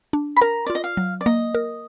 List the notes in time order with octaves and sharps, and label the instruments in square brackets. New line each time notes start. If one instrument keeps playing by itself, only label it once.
[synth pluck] D4
[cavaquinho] B5
[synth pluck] A#4 [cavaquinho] A#5
[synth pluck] F4 [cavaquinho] D5
[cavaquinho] D#5
F5
[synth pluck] F#3
[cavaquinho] D5
[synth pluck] A#3 [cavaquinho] D#5
[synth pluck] A#4